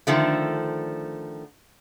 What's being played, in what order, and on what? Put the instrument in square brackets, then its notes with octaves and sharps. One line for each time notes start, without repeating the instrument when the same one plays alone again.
[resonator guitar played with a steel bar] D3 D#3 F3 A3